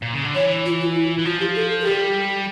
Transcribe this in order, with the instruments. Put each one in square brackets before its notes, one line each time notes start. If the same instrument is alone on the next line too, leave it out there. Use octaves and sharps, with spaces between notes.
[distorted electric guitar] A#2
C#3
D3
[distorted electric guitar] E3 [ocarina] C#5
[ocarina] F4
F4
E4
[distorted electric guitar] E3
[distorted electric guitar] F3 [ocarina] F4
[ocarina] G4
A4
A4
[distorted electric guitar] G3 [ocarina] G4